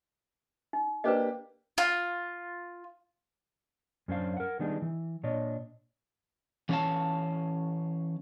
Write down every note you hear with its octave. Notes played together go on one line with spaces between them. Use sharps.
D#4
A#3 D4 G4 B4 C5 D#5
F4
F#2 C#4 D4 C5 F5
A#4 F#5
D#3 G3 B3 D4 D#4 G#4
E3
A#2 D4 C#5 D#5
E3 C#4 C#5 D5 F5 A5